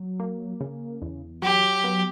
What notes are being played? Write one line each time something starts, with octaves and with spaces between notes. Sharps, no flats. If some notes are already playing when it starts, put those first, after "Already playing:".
Already playing: F#3
A#3
C#3
E2
F#3 G4
B3